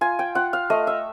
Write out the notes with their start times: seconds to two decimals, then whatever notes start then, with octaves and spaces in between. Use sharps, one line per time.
0.01 F4 G#5
0.19 G5
0.35 F4 F#5
0.53 F5
0.70 A3 D#5
0.87 E5